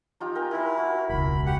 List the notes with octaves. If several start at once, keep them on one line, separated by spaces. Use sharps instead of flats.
D#4 F4 G4
A#4 G5 G#5
E4 A#4 E5 C6
F#4
E1 C#2 B5
G4 F#5